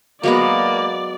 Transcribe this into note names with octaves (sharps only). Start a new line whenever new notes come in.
F#3 G#3 A#3 B3 D5